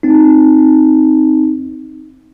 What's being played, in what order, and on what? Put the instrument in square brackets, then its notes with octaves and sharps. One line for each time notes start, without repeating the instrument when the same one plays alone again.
[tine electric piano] C4 D#4